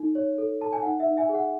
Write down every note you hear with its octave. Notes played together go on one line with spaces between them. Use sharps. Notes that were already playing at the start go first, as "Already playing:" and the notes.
Already playing: D#4 A4
C#5
A4
A4 A5
G#5
D#4 F#5
E5
D#4
E5 G#5
G#4
F#5